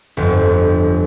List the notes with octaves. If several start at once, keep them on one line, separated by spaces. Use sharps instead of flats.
G1 F2